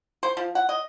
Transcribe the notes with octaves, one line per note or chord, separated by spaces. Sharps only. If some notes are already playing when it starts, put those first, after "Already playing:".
C5
F3
F#5
D#5